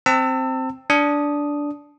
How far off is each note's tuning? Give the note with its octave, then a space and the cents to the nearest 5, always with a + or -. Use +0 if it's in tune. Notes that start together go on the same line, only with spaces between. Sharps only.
C4 +0 A5 +35 E6 +0
D4 -10 D#6 +0